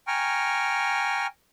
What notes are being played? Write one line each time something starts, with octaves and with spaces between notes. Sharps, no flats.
G5 G#5 A#5 C#6 F6